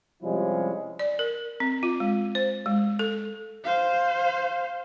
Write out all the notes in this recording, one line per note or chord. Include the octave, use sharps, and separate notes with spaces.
C3 F3 G3 G#3 C#4 E4
D5
A#4
C4
F4
G#3
C5
G#3
A4
C5 F5